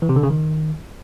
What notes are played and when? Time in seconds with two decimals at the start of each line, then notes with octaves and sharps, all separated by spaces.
0.02 E3
0.09 C3
0.16 D3
0.23 C#3
0.30 D#3